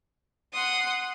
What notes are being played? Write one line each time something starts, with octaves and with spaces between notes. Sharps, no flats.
F#5 C6 D#6